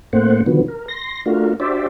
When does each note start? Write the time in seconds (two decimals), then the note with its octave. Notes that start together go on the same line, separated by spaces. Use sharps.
0.13 A2 A3 A#3 C4 C5 F#5
0.46 B2 D3 D#3 F3 F#3 B3
0.68 A#4
0.88 C6 A#6
1.26 A3 D4 F4 F#4 A#4
1.60 D4 F#4 G4 C5 D5 E5